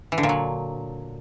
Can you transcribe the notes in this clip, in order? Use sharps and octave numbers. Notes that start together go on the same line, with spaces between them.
E3
D3
A#2
F#3